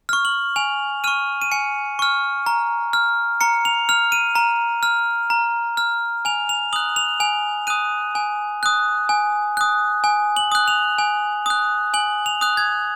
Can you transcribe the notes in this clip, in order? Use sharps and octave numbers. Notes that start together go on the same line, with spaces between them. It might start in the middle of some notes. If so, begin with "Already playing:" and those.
C#6 F6
F#7
G#5 F7
C#6 F6 D#7
D#7
G#5 C#7
C#6 F6
A#5
F6
A#5 C#7
F7
F6 F7
D#7
A#5
F6
A#5
F6
G#5 F7
F7
D#6 F#6 F#7
F7
G#5 F7
D#6 F#6 D#7
G#5
D#6 F#6
G#5
D#6 F#6
G#5
F#7
D#6 F#6
F7
G#5
D#6 F#6
G#5 F#7
F7
D#6 F#6
G#6